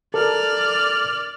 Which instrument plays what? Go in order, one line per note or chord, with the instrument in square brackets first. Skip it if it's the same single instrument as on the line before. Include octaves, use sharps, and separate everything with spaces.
[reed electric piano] A4 A#4 [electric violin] D5 F6